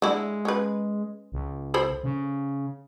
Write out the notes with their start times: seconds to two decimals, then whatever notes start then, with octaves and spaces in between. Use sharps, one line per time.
0.02 D3 G#3 E4
0.45 C#4 B4
1.32 C#2
1.74 A4 C5 B5
2.03 C#3